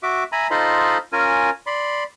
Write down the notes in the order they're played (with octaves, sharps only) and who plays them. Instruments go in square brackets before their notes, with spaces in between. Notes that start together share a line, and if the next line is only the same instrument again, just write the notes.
[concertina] F#4 E5 D6
E5 G#5 A#5 B5
D#4 F4 A4 C5 D#5 B5
C#4 F4 A#4 G#5
D5 B5 C6